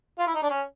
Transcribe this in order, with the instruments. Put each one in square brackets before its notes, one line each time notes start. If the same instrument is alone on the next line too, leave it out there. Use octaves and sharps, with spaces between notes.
[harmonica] F4
E4
D#4
D4
C#4